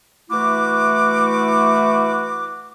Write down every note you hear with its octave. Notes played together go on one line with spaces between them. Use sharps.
E3 A3 E4 F#4 D6